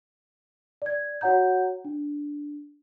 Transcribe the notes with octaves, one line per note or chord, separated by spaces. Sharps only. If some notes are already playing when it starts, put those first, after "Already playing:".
D5 G#6
F#4 C#5 F#5 A#5 G6
D4